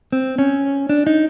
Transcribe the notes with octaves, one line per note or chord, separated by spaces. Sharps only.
C4
C#4
D4
D#4